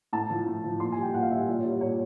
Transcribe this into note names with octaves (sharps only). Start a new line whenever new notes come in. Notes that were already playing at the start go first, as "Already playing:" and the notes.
A2 A5
F3
A2
F3
A#2 C6
G3 G#5
G5
A#2 F#5
F5
G3 E5
A#2 D5
C#5
G3
C#5
A#2 C#5